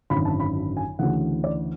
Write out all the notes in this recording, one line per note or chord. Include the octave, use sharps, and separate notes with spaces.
G#1 F#2 D3 F#3 B5
A5
B5
G#5
D2 C#3 E3 F#5
D5